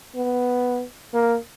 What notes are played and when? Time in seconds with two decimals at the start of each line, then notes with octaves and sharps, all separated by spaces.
0.15 B3
1.14 A#3